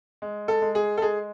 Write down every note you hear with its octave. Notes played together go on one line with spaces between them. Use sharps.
G#3
A4
G#3
G#4
A4
G#3 G#4